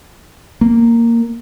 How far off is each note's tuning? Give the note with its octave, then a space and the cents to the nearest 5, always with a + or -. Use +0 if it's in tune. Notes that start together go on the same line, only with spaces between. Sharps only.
A#3 -10